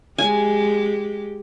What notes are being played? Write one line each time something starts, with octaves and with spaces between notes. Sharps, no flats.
G#3 G4 G#5